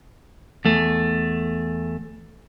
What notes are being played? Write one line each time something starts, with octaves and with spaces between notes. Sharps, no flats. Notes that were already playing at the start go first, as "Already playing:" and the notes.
E2 A3